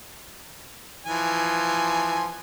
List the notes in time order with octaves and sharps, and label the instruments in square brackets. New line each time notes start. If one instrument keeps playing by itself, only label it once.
[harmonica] E3 F3 G#5